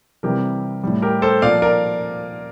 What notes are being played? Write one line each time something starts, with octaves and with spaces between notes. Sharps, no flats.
C3 E3 G3 G4 A#4
A2 G3
G4 A#4
A4 C5
A#2 F3 D5 F5
A#4 D5